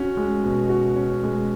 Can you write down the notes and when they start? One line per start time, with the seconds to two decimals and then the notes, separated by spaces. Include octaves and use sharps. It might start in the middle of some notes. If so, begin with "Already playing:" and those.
Already playing: C#4 F#4
0.17 G#3
0.44 B2
0.69 F#4
0.96 C#4
1.23 G#3